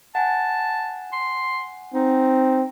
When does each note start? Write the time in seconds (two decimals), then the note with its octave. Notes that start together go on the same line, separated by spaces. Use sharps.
0.15 F#5 G#5 A5
1.13 C6
1.94 C4 D#4